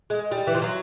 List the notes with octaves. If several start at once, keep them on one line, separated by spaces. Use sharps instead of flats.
G#3
G3
E3
F3
F#3